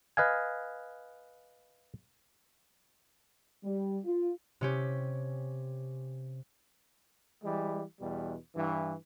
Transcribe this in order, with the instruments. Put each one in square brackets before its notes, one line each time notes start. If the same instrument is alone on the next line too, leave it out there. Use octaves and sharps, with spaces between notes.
[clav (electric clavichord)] B4 D#5 F5 G#5
[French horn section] G3
F4
[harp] C3 C#4 G4
[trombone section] E3 G3 G#3
E2 B2 G3
G2 E3